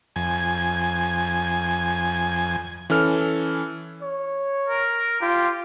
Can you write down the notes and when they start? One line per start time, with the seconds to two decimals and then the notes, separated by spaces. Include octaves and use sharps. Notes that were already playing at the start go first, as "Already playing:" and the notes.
0.16 F2 G#5
2.90 E3 C#4 A4 F6
4.02 C#5
4.68 A#4
5.22 F4 G4